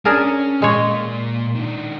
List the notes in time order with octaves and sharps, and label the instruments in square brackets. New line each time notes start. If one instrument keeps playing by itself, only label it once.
[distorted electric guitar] C#4 [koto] D4 G#4 A#4
[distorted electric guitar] A#2 [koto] G#3 C#5
[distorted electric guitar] D#3 D4